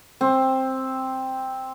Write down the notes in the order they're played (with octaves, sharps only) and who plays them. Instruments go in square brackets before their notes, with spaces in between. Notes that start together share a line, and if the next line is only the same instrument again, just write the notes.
[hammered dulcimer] C4